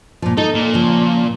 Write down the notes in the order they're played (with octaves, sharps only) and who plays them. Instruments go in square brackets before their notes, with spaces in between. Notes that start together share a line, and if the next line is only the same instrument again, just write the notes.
[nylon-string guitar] A#2 F3
[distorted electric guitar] D#4 [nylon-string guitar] A4
[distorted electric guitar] A#2
[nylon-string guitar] C#3 F3